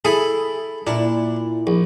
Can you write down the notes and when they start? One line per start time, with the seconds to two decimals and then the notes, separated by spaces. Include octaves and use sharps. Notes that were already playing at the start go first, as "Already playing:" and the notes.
0.05 E4 G#4 A4
0.87 A#2 D4 E4
1.67 A#1